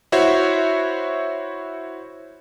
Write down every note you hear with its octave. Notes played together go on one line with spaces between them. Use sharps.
E4 F#4 C5 C#5 E5